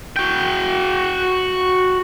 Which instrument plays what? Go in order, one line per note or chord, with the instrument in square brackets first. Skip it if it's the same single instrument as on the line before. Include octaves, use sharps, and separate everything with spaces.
[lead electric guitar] F#4 G5